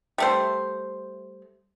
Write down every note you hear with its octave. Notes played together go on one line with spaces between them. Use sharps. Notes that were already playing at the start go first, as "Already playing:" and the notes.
G3 A3 C5